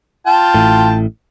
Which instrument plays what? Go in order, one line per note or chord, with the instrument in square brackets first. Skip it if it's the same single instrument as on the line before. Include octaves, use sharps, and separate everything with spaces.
[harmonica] F4 G5 A5
[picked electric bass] A1 A2